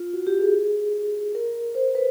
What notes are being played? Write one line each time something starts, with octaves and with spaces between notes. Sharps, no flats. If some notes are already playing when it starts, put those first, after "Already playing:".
Already playing: F4
F#4
G4
G#4
A#4
C5
B4